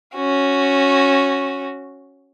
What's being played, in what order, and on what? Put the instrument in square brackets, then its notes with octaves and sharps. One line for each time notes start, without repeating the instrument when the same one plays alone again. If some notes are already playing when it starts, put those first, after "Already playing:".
[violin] C#4 F#4